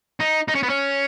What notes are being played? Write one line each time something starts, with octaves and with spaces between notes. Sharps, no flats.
D#4
D#4
C#4
B3
C#4